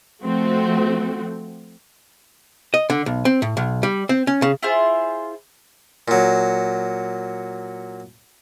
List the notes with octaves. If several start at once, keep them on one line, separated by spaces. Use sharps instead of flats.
F3 A3 C4 F#4
D#5
D3
B1
C4
A2
B1
G3
C4
C#4
C#3
E4 F4 G#4 C5
A#2 F#3